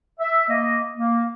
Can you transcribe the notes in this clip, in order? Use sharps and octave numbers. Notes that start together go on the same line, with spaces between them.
E5
A#3 D#5
A#3